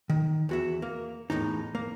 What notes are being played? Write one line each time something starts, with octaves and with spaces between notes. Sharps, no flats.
D#3
E2 F#4 E5
A#3
E2 A2 C#3 D#4
A#3